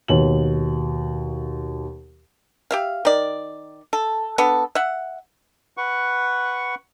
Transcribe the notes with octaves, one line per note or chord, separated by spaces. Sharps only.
D#2 B2 F#7
G4 E5 F5
D#3 D5
A4
B3 D4 A4
E5 F#5
B4 F#5 C#6